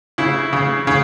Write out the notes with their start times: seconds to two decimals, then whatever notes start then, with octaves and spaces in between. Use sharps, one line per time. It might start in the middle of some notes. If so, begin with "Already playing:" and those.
0.18 C#3 E4
0.53 C#3
0.87 C#3